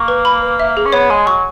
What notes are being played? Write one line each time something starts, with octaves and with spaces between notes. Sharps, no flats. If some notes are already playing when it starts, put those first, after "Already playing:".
Already playing: A#3 C#6
B4
B5
B4
E5
G#4
C#4
B3 C#5
G#3 G#5
F#3 C#6